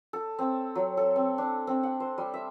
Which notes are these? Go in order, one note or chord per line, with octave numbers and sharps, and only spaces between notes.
A4
C4
F#3
A4
C4
D4
C4
F#5
C5
G3
E5